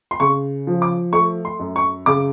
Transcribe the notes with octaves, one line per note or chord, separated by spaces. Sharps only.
C6
C#3 C#6
F3
D6
A3 C#6
C6
F#2
C#6
C#3 D6